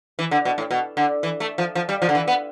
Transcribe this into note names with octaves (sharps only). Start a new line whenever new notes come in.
E3
D3
B2
A2
B2
D3
E3
A3
F3
F3
G3
F3
D3
E3
B3